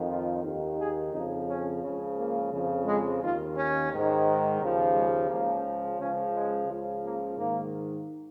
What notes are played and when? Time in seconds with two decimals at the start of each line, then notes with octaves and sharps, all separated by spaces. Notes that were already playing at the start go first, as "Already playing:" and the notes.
Already playing: F2 D#3
0.08 F4
0.43 D#2 D#3
0.78 G#4
1.12 F2 C#3 F3 D#4
1.47 C#4
1.82 C#2 C#3 F3
2.17 A#3
2.52 F2 C#3 F3
2.86 G#3
3.21 D#2 D#3 F4
3.56 C#4
3.91 G#2 D#3
4.60 D#2 C#3 F3
4.94 G#3
5.29 C#2 C#3 F3 A#3
5.98 C#2 C#3 F3 C#4
6.33 G#3
6.67 C#2 C#3 F3
7.03 A#3
7.37 G#2 D#3 A#3